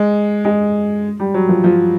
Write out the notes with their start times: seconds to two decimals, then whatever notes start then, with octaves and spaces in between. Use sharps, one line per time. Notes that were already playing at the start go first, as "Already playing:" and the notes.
Already playing: G#3
0.45 G#3
1.20 G3
1.34 F#3
1.49 F3
1.64 F3